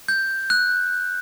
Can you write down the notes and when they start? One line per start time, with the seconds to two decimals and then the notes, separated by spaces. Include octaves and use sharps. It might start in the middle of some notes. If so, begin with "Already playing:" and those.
0.08 G6
0.50 F#6